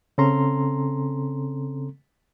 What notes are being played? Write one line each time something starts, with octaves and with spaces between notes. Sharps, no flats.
C#3 C4 C#4 A4 A#5 C6